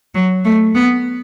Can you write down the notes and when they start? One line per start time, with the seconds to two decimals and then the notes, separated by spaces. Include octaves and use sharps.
0.15 F#3
0.45 A3
0.75 B3